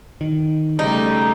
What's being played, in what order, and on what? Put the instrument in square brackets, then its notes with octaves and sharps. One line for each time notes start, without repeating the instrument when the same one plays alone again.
[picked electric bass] D#3
[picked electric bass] C#3 [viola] G3 A3 [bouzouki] D#4